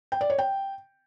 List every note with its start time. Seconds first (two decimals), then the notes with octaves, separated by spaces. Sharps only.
0.12 G5
0.21 D5
0.30 C#5
0.39 G5